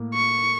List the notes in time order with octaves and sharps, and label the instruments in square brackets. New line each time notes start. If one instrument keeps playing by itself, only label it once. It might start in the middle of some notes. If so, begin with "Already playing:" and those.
Already playing: [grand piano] A2 A#3
[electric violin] C#6